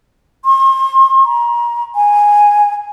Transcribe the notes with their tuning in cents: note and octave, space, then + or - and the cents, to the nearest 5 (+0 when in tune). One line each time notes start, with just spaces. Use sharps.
C6 +40
A#5 +30
G#5 -5